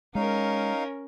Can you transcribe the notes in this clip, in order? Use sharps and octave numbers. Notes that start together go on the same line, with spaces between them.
G#3 C#4 D#4 A#4 F5